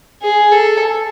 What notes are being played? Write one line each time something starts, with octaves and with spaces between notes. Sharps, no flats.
G#4
A4